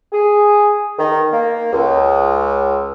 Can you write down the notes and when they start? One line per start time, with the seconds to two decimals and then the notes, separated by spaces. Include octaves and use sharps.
0.13 G#4
0.99 D#3
1.32 A#3
1.73 C#2